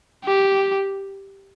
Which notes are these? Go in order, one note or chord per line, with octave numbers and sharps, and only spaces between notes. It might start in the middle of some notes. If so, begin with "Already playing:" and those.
G4